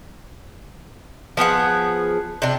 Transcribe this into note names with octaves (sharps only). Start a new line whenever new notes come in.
F3 B3 G#4 F#5
C3 D4